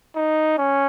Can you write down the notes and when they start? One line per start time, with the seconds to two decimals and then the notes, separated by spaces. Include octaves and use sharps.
0.16 D#4
0.58 C#4